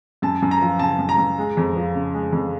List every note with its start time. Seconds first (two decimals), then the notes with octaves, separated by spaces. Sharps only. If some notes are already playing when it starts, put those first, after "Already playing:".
0.22 F#2 A5
0.42 F#2
0.51 A#5
0.61 F3
0.79 C#3 A5
0.99 F#2
1.09 A#5
1.18 F#2
1.38 G#3
1.57 F2
1.76 F3
1.95 C#3
2.14 G#3
2.33 F2